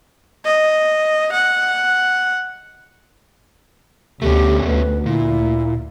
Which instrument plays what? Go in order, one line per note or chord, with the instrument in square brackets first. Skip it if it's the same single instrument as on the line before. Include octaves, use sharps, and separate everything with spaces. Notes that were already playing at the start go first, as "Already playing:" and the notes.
[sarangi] D#5
F#5
[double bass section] D2 [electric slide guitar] A3 B3 C#4 [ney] G4
[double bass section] D2 [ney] B4
[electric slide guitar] A#2 [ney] E4